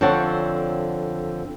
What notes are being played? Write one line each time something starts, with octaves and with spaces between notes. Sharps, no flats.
F2 D3 C4 C#5 F#5 A5